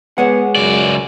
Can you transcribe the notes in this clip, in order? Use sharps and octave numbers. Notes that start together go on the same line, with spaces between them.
G#3 B3 G#4 C#5 F#5
C#2 F#2 D5